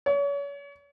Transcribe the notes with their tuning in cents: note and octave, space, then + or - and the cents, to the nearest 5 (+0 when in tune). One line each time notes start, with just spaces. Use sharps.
C#5 +35